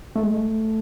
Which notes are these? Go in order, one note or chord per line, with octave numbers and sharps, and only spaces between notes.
A3
G#3
A3